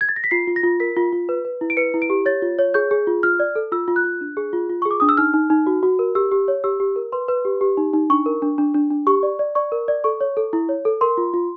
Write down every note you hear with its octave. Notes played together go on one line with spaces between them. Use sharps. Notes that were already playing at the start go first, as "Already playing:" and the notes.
G#6
A6
A#6
B6
F4 C7
F4
A#6
F4
A#4 B6
F4
F4
B4
B4
E4
D7
B4 C#7
E4
D7
G4
C#5 A6
F4
C#5
G#4 G6
G#4
F4
F4 F6
D5
A4
F4 E6
F4
F#6
F4
D4
G#4
F4
F4
G#4 C#6
D6
D4 D#6
E6
D#4 F6
D#4
D#4
F#4
F#4
A#4
G4 E6
G4
C#5
G4 E6
G4
A#4
B4 C6
B4
G4
G4
D#4
D#4
D4 C#6
A#4
D4
D4
D4
D4
G4 C#6
D5
D5
D5 C#6
A#4
D5
A4 C#6
C#5
A4
E4
C#5
A4
A#4 C6
F4
F4